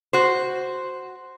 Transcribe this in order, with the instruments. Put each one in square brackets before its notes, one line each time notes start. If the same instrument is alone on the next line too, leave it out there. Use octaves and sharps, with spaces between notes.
[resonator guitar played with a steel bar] F#4 C5